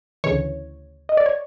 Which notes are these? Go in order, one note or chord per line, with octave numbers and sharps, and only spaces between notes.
D2 C#3 E3 C#5
D#5
D5
C#5